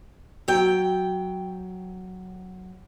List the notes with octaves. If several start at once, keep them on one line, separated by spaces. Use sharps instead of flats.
F#3 G5